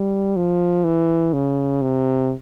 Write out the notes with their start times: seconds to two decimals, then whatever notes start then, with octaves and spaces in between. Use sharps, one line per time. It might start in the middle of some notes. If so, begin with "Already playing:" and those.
Already playing: G3
0.36 F3
0.84 E3
1.33 C#3
1.82 C3